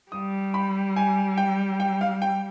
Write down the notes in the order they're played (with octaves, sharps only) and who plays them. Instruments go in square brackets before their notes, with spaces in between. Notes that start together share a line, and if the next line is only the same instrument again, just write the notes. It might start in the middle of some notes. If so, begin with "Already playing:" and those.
[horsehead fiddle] G3 [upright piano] D#6
[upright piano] B5
G#5
G5
G5
F5
G5